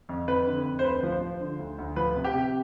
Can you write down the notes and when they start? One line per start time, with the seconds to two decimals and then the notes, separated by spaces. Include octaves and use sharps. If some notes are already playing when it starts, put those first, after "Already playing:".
0.09 F2
0.28 F2 B4
0.46 D3
0.65 F2
0.79 C5
0.84 D2 B4
1.03 F3
1.12 C5
1.21 F3
1.41 D3
1.59 D2
1.78 D2
1.96 F3 B4
2.16 C3
2.24 G4
2.34 C3